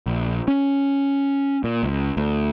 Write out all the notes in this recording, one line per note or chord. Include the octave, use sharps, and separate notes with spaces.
A#1
C#4
A#2
C#2
D2